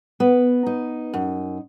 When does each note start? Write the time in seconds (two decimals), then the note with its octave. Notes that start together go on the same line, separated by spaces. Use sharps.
0.20 B3
0.66 D#4
1.14 F#2